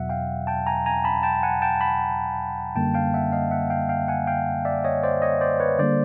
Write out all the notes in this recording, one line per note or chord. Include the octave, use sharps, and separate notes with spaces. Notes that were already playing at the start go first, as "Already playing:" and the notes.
Already playing: E2 B2 F#3 E5 F#5
F5 G5
G5 A5
G#5 A#5
G#5 A#5
A5 B5
G5 A5
F#5 G#5
G5 A5
A5 B5
F#2 D3 G3 A#3 G5 A5
F5 G5
E5 F#5
D#5 F5
E5 F#5
F5 G5
F5 G5
F#5 G#5
F5 G5
D5 E5
C#5 D#5
C5 D5
C#5 D#5
C5 D5
B4 C#5
D3 G3 A#3 C5 D5